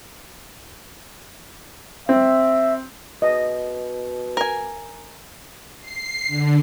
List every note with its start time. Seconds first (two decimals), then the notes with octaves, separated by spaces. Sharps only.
2.09 C4 E5
3.22 B2 D#5
4.37 A#4 G#5
5.80 C7
6.27 D3